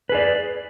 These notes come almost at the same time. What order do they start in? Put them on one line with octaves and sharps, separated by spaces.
B4 G#4 D5